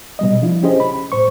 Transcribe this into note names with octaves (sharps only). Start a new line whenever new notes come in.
B2 G3 D#5
F3 D4 E4 F4
C#4 G4 G#4 C5 D#5
B5
A2 C5 C#6